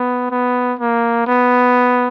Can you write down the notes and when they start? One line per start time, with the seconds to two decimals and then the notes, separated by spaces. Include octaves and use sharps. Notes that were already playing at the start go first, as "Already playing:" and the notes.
Already playing: B3
0.31 B3
0.79 A#3
1.27 B3